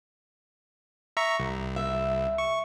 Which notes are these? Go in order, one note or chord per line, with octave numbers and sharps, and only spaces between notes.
E5 A#5 C#6
C2
E5
C#6